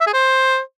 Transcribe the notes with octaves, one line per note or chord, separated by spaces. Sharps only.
E5
G#4
C5